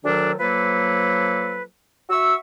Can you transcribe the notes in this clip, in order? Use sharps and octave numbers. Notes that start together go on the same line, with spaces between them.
D2 D#3 F#3 A3 D4
F3 F#3 A#3 A4 B4
F#4 E5 C#6 E6